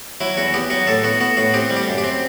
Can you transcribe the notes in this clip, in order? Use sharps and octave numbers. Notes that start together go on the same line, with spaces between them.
F#3 E4
E2 F#4
B3 G4
F#3 F#4
A2 A4
B3 F#4
B3 F#4
A2 F#4
C4 G4
G3
G4
F#2
G4
C4